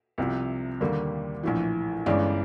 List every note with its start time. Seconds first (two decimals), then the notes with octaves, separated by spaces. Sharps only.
0.18 C2 C3 F3
0.81 D#2 D3 G3 A#3
1.43 A#1 A2 E3
2.06 G1 G2 E3 G#3 C#4 D5